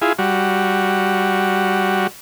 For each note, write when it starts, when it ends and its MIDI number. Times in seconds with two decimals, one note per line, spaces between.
0.02 0.13 64
0.02 0.13 65
0.02 0.13 68
0.19 2.07 55
0.19 2.07 66